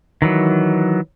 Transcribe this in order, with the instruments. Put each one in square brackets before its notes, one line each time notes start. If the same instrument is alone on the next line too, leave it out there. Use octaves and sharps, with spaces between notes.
[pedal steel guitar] D#3 E3 F#3